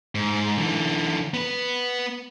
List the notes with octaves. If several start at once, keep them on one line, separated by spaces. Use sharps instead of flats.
G#2
D3 E3
B3 B4